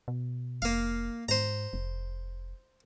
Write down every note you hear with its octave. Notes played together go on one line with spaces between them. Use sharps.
B2
F1 A#3 F5
G#2 C5 A#5
F1